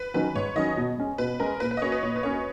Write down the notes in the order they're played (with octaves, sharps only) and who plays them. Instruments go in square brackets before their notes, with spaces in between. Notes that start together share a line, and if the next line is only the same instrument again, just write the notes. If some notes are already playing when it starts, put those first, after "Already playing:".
Already playing: [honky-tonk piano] B4
[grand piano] D#3 F#3 C#4 [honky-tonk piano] B4
[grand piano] G#2 [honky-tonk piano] C#5
[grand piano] D#3 F#3 C#4 [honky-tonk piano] D#5
[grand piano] B2
G#3 C#4
[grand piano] B2 [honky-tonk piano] B4
[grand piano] G#3 C#4 [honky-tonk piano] A#4
[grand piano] A#2 [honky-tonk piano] B4
[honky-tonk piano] B4
D#5
[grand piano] A#3 C#4 F#4 [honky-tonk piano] C#5
[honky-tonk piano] B4
[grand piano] A#2 [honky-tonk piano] C#5
[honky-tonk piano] B4
[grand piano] A#3 C#4 F#4 [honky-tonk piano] C#5